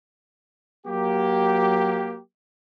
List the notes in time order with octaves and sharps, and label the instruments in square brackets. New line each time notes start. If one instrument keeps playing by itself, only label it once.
[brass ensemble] F#3 A#3 G4